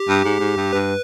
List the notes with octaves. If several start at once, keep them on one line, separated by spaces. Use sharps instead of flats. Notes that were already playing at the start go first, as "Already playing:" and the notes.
Already playing: G4
G2
G#2
G#2
G2
G2 B4